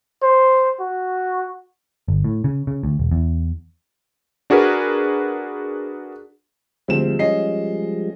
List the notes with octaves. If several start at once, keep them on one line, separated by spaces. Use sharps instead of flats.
C5
F#4
G1
A2
C#3
C#3
D2
E1
E2
D4 F#4 G#4 A#4 B4
D2 F3 G3 G#3 C4 E7
C#4 D#5 C7